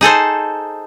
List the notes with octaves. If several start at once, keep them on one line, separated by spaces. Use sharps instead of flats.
D#4 G#4 A4 C5